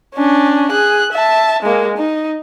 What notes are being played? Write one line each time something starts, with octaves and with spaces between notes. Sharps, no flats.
C#4 D4
G#4 F#6
E5 A5
G#3 A#3
D#4